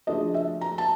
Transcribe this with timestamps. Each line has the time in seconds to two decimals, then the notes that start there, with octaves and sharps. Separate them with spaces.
0.07 C#3 F3 A3 D4 D#5
0.34 E5
0.61 A#5
0.78 A5